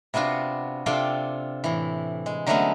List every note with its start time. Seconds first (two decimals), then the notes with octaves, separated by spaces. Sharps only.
0.14 C3 B3 D4 F4 F#4
0.86 C3 D4 F4 A4 G5 C6
1.64 A2 E3
2.26 G#3
2.47 D3 F#3 G#3 A3 B3 C#4